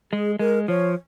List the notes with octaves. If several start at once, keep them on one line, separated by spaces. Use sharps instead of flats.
G#3 G#4
G#3 A#4
F3 C#5